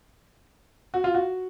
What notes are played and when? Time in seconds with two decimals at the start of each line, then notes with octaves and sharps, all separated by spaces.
0.94 F#4
1.04 F4
1.14 F#4